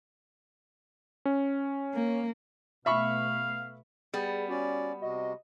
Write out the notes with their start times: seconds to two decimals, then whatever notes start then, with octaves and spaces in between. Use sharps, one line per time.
1.25 C#4
1.94 A#3
2.86 B2 A3 B3 E5 F5 B5 C#6
4.14 G3 B3 G#4
4.49 C#4 F#4 D5
5.02 C3 F#4 D#5